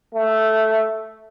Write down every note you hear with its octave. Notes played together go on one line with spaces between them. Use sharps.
A3